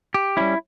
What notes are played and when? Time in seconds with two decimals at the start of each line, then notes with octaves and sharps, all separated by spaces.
0.14 G4
0.37 G3 C#4 E4